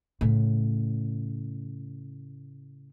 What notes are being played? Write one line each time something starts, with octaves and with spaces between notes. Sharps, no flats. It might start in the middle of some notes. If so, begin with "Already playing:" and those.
A2 C#3